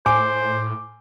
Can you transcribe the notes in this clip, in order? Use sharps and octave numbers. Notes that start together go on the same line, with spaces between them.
A2 C5 G#5 D6